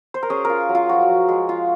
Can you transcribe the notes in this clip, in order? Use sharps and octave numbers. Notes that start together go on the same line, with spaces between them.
C5
A#4
C#4 G#4
F4 A#4
F#3
F4
F3 F#4
F3
G#3
F4